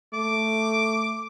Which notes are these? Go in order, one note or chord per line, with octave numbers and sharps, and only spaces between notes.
A3 D6